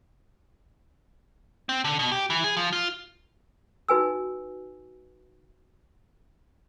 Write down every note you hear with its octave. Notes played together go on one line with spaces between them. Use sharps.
C4
D3
B2
G4
E3
G#4
F3
F4
D#4 F#4 B4 G#5 E6